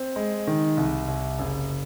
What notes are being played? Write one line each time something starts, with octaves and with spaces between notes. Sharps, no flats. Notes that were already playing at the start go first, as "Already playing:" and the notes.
Already playing: C4
G#3
D#3
C2
C2
F#1